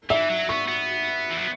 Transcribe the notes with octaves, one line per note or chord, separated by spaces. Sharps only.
E3 E5
F#3
B3 C#6
B3
E3
F#3